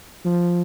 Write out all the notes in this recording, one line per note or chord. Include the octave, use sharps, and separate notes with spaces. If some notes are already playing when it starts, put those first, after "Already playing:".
F3